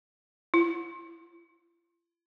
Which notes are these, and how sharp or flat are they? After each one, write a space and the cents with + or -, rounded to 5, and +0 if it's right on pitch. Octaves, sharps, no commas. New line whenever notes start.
F4 -45